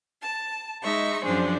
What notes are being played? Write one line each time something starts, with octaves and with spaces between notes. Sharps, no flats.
A5
G#3 D#4 E5 C#6
F#2 F3 D4 G#4 C5